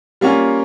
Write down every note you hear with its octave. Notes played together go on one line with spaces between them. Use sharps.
G3 A#3 C#4 F4